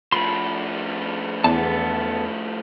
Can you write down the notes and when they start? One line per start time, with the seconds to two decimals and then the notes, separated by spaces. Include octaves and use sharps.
0.12 A2 F3 B5 C6
1.44 E2 B3 A4 A5